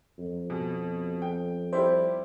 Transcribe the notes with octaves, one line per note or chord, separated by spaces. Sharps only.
F2
B2
G5
G3 E4 G4 C5